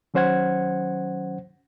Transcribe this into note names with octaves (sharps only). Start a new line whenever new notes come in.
D#3 F#3 C#4 C5 F#5 G#6